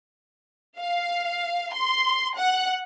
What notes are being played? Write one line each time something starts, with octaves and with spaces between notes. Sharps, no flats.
F5
C6
F#5